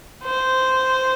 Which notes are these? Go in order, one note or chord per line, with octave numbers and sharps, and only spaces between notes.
C5